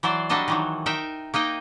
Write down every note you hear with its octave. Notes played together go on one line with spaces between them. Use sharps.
E3 F#3 C5 D5
F#3 G3 D4 A4 D#5 A5
D#3 E3 F#3
D#4 A#4 E5 G5
A#3 D#4 D#5 G5